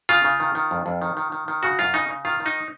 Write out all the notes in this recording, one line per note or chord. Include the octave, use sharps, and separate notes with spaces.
C#3 F4
C#3
D#3
D#3
F2
F2
D#3
D#3
D#3
D#3
C#3 F#4
F#2 F4
C#3 D#4
C#3
D#3 F4
D#3
D#4